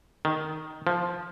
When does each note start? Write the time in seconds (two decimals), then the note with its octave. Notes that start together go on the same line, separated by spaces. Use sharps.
0.25 D#3
0.87 F3